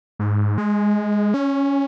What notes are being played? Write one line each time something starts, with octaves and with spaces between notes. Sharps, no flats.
G#2
G#3
C#4